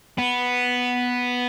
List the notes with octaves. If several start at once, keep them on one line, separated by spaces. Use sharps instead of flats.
B3